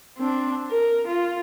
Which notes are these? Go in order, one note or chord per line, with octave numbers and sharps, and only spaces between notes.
C4 D4
A#4
F4